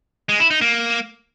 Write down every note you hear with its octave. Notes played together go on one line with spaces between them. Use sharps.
G#3
E4
D#4
A#3